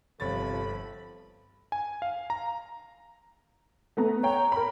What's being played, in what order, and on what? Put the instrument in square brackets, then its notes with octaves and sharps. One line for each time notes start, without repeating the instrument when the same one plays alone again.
[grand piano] G1 C#5 A6 [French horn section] C3 F3 [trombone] A4 [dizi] B5
[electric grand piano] G#5
F5
A#5
[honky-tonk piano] A3 B3 A#5
[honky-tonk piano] C#5 G5 [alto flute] A#5
[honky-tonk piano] A#4 B5